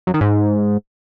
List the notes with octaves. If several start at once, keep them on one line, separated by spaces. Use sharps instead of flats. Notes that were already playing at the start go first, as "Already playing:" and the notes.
F#2
D#3
G#2